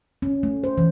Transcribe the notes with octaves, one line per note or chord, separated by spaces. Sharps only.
C#4
A3
C5
E3